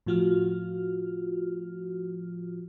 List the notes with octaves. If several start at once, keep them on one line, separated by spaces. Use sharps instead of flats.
A2 F3 F4 F#4 F6